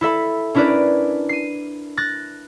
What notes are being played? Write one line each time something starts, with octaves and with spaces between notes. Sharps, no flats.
E4 A4 E5 B5
C#4 D4 E4 A#4 B4 D5
C7 D#7
F#6 A6 A#6